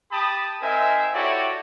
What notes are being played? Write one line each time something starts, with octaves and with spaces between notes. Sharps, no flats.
G4 A5 B5 D#6
C4 D#4 A#4 C5 E5 G#5
E4 F#4 G4 A4 C#5 D5